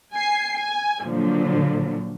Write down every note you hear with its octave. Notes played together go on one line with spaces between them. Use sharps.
G#5 C7
G#5
A#2 D3 F3 F#3